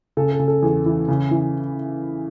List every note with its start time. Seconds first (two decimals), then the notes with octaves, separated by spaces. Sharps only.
0.17 C#3 A4
0.32 A4
0.39 C#3
0.48 A4
0.62 E2 G#4
0.86 E3
1.08 C#3
1.31 E3